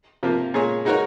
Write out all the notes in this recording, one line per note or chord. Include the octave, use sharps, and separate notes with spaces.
C3 F3 A#3 F4
A#2 G#3 C#4 G#4 C#5
G#3 D#4 F#4 A#4 C#5